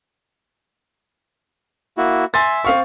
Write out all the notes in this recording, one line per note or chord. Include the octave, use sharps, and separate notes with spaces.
A#3 E4 F#4
E5 G#5 C6 A6
C4 F5 C#6